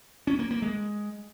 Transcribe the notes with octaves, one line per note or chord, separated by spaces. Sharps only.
C#4
A#3
A#3
G#3